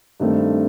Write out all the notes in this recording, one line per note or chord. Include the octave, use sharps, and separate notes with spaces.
G2 D#3 A3 C4